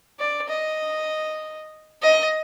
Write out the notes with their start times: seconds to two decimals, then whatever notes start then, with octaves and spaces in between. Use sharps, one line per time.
0.19 D5
0.50 D#5
2.02 D#5